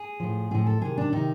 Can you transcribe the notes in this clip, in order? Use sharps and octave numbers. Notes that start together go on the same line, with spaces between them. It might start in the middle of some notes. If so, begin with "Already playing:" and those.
Already playing: G#4
A2 F3
A2 F3 G#4
A4
C3 D#3 G#4
D4
C3 D#3 D#4